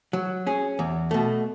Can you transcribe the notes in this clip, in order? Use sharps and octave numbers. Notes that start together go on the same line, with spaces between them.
F#3
C#4 G#4
E2
B2 A3